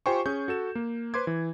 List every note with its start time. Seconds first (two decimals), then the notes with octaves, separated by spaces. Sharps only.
0.06 F4 G4 C5 G5 G#5 C#6
0.26 C#4 G#4 C#6 G6
0.48 F#4 A4 E7
0.75 A#3
1.14 B4 C5 C6 D6 G#6
1.27 E3